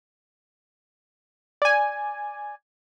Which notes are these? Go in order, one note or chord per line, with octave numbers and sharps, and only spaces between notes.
D5 G#5